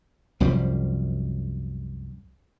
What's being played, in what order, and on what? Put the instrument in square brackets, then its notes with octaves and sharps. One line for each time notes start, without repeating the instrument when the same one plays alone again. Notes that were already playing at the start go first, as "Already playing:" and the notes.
[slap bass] C2 F#2 F3 G3